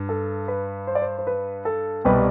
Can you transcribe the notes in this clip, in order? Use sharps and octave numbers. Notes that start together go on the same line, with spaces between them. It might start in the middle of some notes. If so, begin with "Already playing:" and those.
Already playing: G2
A4
B4
C5
D5
C5
C5
B4
A4
C2 B2 G3 C4 B4